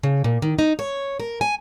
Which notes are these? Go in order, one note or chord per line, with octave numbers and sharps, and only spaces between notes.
C#3
A#2
D#3
D#4
C#5
A#4
G#5